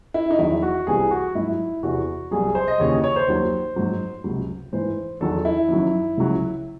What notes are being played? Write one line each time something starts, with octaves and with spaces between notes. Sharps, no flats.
E4
D#4
E2 D#3 F#3 E4
F#4
C2 C3 E3 G#4
F#4
G#2 F#3 E4
E2 C3 E3 F#4
C2 C3 F#3 G#4
C5
D#5
D#2 C#3 E3 C#5
D#5
C#5
C5
D#2 D#3 F#3
G#2 F#3
C#2 C3 F#3
G#2 E3 C5
E2 D#3 F#3 A4
E4
F#2 D#3 F#3
C#2 C#3 F#3